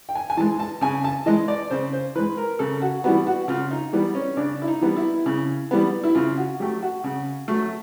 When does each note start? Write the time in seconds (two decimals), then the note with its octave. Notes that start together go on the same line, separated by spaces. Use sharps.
0.09 G5
0.15 G#5
0.30 G#5
0.37 E3 G#3 A5
0.60 A5
0.81 C#3 G#5
1.04 A5
1.26 E3 G#3 D#5
1.48 D5
1.70 C#3 C5
1.93 C5
2.15 E3 G#3 B4
2.37 A#4
2.59 C#3 A4
2.82 F#4
3.04 E3 G3 B3 F#4
3.27 F#4
3.48 C#3 F4
3.71 D#4
3.93 E3 G3 B3
4.15 C#4
4.37 C#3 D4
4.62 E4
4.68 D#4
4.81 E3 G3 B3
4.97 E4
5.26 C#3
5.71 E3 G3 B3
6.04 E4
6.15 C#3 F4
6.37 F#4
6.60 F#3 A3 G4
6.82 F#4
7.04 C#3
7.48 F#3 A3